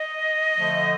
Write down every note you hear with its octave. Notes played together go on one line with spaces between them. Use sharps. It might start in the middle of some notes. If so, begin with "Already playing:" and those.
Already playing: D#5
D3 F3 A3